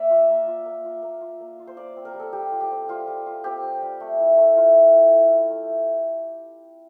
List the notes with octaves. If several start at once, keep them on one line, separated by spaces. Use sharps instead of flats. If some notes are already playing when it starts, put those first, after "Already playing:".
Already playing: A#3 D5 E5
F4
A#3
F4
A#3
F4
A#3
F4
A#3
F4
C5
F4 D5
C4
A#4
G3
A4
G3 G4
F4
G4
C4
G3 F4
G3
F4
C4 G4
G3
G3
A3
E4
A3
E4 F4
A3
E4
A3
E4
A3